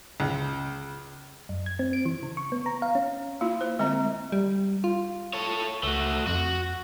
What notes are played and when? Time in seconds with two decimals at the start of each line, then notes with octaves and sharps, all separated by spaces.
0.20 C#2
1.49 F#2
1.66 G#6
1.79 C4
1.93 D7
2.06 E3
2.23 C#3
2.37 C#6
2.52 B3
2.66 A#5
2.82 F5
2.95 C#4
3.41 A#3 E4 F4
3.61 C5
3.79 D3 G#3 C4 D#5 A#5
4.32 G3
4.84 F4
5.33 A4 C#5
5.83 C#2 A3 F#4
6.27 F2 F#4